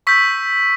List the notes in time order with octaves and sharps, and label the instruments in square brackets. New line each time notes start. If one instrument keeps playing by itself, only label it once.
[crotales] C#6 E6 G6 B6